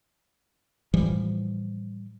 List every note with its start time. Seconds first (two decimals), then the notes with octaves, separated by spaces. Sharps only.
0.94 A2 E3 F3 G3